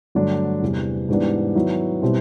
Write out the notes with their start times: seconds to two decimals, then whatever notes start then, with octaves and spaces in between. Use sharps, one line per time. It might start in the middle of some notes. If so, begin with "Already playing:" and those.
0.15 G2 D3 F#3 A3 D4
0.62 E2 C3 E3 G3
1.09 G#2 E3 G3 B3 D4
1.55 D#3 F#3 B3 E4
2.02 B2 G3 C4 E4